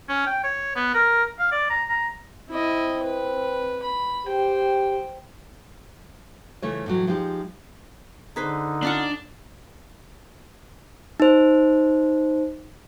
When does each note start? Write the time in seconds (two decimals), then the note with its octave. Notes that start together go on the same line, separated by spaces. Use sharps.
0.09 C#4
0.27 G5
0.44 C#5
0.76 B3
0.94 A#4
1.39 F5
1.52 D5
1.70 A#5
1.90 A#5
2.50 C4 E4 D#5
3.04 B4
3.83 B5
4.26 G4 C5 G5
6.62 C#3 E3 A3 F4 C#5
6.86 A2 E3 F#3
7.07 F3 G#3 D#4 G4
8.36 D3 D#4 G#4 B4 C5
8.83 C#4 D4 F4 F#5
11.20 D#4 C5